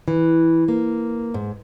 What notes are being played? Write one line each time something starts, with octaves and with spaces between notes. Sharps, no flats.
E3
A#3
G#2